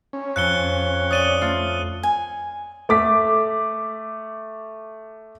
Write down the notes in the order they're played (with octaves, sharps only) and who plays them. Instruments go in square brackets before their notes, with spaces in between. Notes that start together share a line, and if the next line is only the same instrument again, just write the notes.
[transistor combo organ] C#4
[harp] F2 [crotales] F#6 C#7 G7
[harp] C#5 D5 [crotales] D#6 D#7 G7
[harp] A3 F4
[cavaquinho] G#5
[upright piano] A3 D6 B6